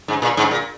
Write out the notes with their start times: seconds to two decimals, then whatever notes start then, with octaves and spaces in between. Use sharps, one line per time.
0.08 G#2
0.22 A#2
0.37 G#2
0.51 A#2